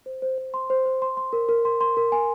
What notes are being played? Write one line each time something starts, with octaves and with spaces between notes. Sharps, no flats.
C5
C5
C5
C6
C5
C5
C6
C6
A#4
A#4
C6
C6
A#4
G#5